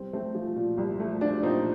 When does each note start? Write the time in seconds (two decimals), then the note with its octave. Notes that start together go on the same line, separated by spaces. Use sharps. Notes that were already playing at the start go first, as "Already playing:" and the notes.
Already playing: C2 C4
0.13 A3 C4
0.35 F3
0.56 A#2
0.78 C2
1.00 A3
1.21 F3 D4
1.43 A#2 C4 D#4